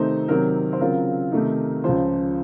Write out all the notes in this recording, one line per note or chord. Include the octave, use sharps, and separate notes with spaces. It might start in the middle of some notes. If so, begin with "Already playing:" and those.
Already playing: C3 D#3 A3 C4 D#4 C5
C3 D#3 F#3 C4 A#4
C5
C#3 F#3 C4 F4 A#4
C3 D#3 A3 D#4
C#2 C#3 F3 C5